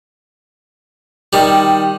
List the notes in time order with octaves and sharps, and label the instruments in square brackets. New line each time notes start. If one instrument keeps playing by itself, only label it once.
[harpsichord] D#3 G3